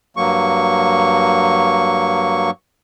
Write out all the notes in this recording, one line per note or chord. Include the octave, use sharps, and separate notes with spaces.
G2 F#3 A#3 C#6